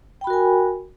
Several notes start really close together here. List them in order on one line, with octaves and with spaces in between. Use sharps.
G5 B5 F#4 A#4 G#5